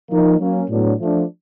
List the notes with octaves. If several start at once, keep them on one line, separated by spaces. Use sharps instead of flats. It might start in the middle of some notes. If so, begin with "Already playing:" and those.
F3 A#3 D#4
F#3 A#3 C#4
A2 F#3 B3 D4
F3 A3 D4